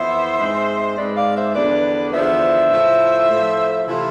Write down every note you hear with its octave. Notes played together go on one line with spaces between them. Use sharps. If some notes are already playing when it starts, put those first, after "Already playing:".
Already playing: F2 E3 B3 E4 C5 E5
G#2 G#3 C4
G#2 G#3 C4 B4 D5
D5 F5
C5 E5
E2 D3 F3 B3 D4 B4 D5
E2 D3 F3 B3 D4 C5 E5
A2 F3 A3 E4
A2 F3 A3 E4
C3 E3 A3 E4 F4